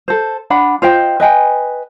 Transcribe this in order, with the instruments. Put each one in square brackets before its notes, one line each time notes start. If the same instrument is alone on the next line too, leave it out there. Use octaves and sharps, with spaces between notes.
[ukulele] A4 C5
D4 F#5 B5
F4 C5 D#5 G5
B4 D#5 G5 G#5